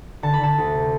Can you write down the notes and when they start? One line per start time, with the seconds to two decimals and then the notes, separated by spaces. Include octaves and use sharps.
0.23 D3 A5
0.34 B5
0.41 D3 A5
0.58 D2
0.75 C3